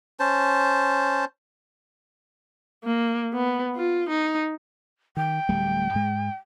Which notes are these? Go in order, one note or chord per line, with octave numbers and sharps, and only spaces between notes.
C#4 C5 A5
A#3
B3
F4
D#4
D#3 G5
D1 G3 A3
G#2 G#3